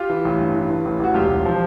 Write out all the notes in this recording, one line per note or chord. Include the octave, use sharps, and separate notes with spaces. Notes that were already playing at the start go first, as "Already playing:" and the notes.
Already playing: F4 G4
E3
A1
G2
E3
E3
A1
A1 F#4
E1 F4 G4
E1
F3